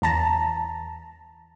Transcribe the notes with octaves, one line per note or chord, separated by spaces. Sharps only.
E2 A5 A#5